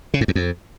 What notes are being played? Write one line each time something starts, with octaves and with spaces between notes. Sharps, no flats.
C#3
G#2
E2
F2